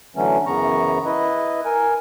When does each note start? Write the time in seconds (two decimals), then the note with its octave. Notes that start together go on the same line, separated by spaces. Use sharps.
0.16 D3 E3 F#3 A3 C#4
0.47 F#2 C#3 E3 B3 A#5 C#6
1.05 E4 B4 D#5
1.65 A#4 G#5